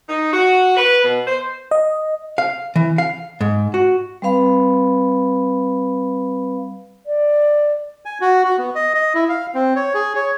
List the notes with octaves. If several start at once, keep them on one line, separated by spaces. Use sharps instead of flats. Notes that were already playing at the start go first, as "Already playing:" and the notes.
D#4
F#4
B4
B2
C5
D#5
F5
E3
F5
G#2
F#4
G3 C4 B4 F5 B5
D5
G#5
F#4
F#4
B3
D#5
D#5
E4
F5
C4
C#5
G#4
C#5